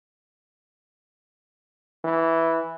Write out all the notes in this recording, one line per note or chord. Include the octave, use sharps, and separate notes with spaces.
E3